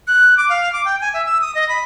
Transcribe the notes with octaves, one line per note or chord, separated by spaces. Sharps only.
F#6
D6
F5
D6
G5
G#5
E5
E6
D#6
D#5
B5